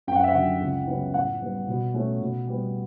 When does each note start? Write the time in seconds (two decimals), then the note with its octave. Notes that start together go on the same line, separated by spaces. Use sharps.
0.07 F#2 G5
0.16 F#5
0.24 E5
0.31 D3 F#3 F#5
0.61 C#2
0.87 C#3 F#3 B3
1.14 A2 F#5
1.41 G3 B3
1.68 B2
1.94 A3 C#4
2.21 B2
2.47 G3 B3